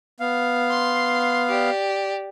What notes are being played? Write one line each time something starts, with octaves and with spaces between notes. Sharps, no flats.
B3 F5
C6
G4 D5